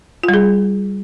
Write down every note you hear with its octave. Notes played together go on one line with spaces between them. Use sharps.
F4
G3
G#4